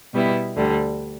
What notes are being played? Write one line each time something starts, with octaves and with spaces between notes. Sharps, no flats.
B2 G3 B3 E4
D2 D3 G3